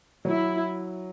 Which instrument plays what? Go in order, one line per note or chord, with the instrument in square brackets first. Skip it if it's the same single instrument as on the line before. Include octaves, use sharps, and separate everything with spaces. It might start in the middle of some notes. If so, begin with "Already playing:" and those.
[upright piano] F#3 [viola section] E4